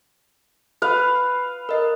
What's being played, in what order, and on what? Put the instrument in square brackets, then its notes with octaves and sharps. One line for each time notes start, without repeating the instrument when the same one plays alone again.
[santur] B4 F5
[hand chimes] A#4 D#5